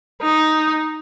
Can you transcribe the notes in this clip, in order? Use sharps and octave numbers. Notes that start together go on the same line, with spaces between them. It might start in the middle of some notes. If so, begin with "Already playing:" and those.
D#4